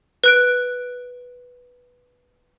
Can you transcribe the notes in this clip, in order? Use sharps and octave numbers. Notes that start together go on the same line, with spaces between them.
B4 F#6 D7